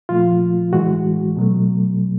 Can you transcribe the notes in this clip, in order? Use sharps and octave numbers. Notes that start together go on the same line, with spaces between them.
A#2 F3 A3 F4
A2 E3 G#3 F#4
B2 F#3 A3